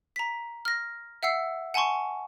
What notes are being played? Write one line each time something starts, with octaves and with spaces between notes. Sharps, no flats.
A#5 B6
F6 A#6
E5 F#5 E6 C7
F#5 G#5 A5 C6 C#6